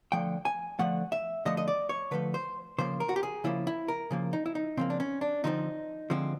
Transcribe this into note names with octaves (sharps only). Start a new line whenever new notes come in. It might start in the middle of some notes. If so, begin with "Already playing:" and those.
D3 F3 A3 G5
G#5
D3 F3 A3 F#5
E5
D3 F3 A3 D#5
D#5
D5
C#5
D3 F3 A3 B4
C5
C#3 F3 A#3 C5
A#4
F#4
G4
G#4
C#3 F3 A#3 E4
E4
A#4
C#3 F3 A#3
D#4
E4
D#4
C#3 F3 A#3 C4
D4
C#4
D4
D3 F3 G#3 C4 D#4
D3 F3 G#3 C4